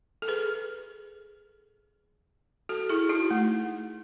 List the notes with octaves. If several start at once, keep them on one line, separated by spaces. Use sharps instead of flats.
A4
G#4 B4
F#4 A4
E4 G#4
D#4 F#4
A3